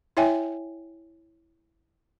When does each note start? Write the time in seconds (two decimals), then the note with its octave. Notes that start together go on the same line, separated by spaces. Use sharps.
0.17 E4 C#5 E5 G5 G#5